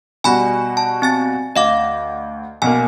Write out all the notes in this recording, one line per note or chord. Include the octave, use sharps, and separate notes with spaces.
B2 G3 F#4 G#5 B5
A5
C4 G#5 A6
D2 D#5 F5 D6
B1 B2 A#3 G#5